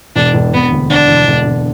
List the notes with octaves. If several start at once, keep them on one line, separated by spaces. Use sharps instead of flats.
E1 D4
E1
E1 B3
D2
D3 D4
E1
E1
E1